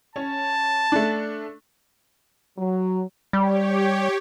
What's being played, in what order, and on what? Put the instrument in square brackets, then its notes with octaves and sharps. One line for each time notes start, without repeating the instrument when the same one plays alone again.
[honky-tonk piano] C#4 [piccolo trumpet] A5
[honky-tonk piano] A3 D4
[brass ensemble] F#3
[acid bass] G3 [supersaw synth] G4 C#5